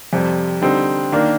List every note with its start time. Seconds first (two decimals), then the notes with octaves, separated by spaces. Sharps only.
0.13 F2 C3 G3
0.62 D3 G3 C4 D#4
1.12 D#3 A#3 D4